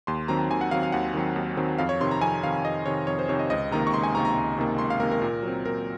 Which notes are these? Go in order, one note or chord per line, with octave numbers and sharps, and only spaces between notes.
D#2 C6
D#3 F#3 C4 A#5
D#2 G#5
F#5
D#3 F#3 C4 F5
F5
D#2 F#5
D#3 F#3 C4
D#2
D#3 F#3 C4
F2 F5
C#5
C3 D#3 C6
A#5
F2 G#5
C3 D#3 F5
F2 D#5
C3 D#3 C#5
F2 C#5
C5
C3 D#3 C#5
D#5
C#2 D#5
C3 D#3 A#3 A#5
C#6
C#2 C6
G#5
C3 D#3 A#3 A#5
A#5
C#2
C3 D#3 A#3
C#2 C6
F5
C3 D#3 A#3 A#4
A#4
A#2
F#3 C4
A#2 A#4